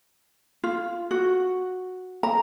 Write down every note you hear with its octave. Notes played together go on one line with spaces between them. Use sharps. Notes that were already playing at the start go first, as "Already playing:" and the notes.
F4
F#4
A#5